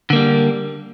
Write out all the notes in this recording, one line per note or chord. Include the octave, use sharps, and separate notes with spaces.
D3 G3 A#3